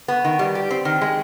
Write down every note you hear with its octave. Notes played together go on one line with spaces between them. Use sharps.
B3
D#3
G3
G4
C4
D#3
G#3